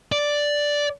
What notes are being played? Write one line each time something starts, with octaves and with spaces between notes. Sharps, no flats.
D5